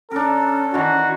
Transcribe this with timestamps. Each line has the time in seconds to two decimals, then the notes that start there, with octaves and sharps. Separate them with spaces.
0.11 C#4 D4 A4 A#4
0.74 D#3 E3 F#4